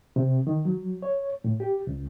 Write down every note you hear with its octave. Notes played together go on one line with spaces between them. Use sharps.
C3
D#3
F#3
C#5
A2
G4
C#2